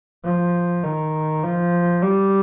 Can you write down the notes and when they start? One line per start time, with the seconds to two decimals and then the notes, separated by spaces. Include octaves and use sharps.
0.25 F3
0.83 D#3
1.44 F3
2.03 G3